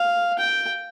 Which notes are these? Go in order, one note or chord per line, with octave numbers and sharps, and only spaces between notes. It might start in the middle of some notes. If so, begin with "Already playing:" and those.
Already playing: F5
G5